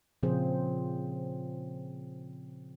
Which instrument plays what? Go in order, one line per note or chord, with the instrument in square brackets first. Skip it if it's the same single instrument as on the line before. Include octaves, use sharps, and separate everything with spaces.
[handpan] A#2 C#3 F3 C4 G#4 C5